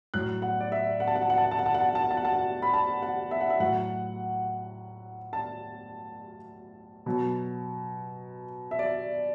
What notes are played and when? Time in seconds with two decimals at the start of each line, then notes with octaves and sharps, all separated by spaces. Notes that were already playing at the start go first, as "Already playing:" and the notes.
0.14 A2 F#3 F#6
0.42 F#5
0.60 D5
0.72 E5
1.00 F#5
1.07 A5
1.15 F#5
1.22 A5
1.30 F#5
1.38 A5
1.45 F#5
1.51 A5
1.59 F#5
1.66 A5
1.74 F#5
1.81 A5
1.89 F#5
1.95 A5
2.03 F#5
2.11 A5
2.17 F#5
2.25 A5
2.33 F#5
2.62 B5
2.73 A5
3.02 F#5
3.31 E5
3.41 F#5
3.50 E5
3.60 A2 F#3 F#5
5.33 A5
7.06 B2 F#3
8.71 E5
8.79 D5